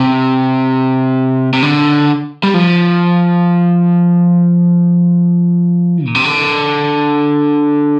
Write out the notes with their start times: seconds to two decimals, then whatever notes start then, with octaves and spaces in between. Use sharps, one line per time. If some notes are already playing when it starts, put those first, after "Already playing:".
Already playing: C3
1.53 C3
1.62 D3
2.43 G3
2.54 F3
6.06 A#2
6.15 C3
6.24 D3